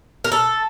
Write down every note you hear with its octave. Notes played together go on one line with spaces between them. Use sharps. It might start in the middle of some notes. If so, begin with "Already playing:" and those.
A#4
A4